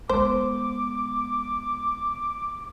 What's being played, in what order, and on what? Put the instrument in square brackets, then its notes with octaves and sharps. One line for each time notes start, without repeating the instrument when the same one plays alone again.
[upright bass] G#3 B3 [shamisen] C5 [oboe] D6